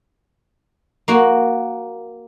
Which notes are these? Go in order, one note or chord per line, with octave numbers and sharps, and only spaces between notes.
A#3 F#4